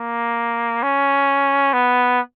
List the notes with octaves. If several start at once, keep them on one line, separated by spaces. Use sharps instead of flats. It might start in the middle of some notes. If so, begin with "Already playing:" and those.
Already playing: A#3
C#4
B3